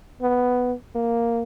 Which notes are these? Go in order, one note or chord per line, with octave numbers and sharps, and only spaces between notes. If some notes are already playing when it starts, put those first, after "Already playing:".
B3
A#3